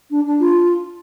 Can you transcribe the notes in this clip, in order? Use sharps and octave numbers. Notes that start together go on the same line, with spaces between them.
D4
D4
F4